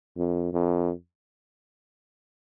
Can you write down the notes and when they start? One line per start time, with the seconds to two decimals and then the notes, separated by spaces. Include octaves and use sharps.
0.17 F2
0.53 F2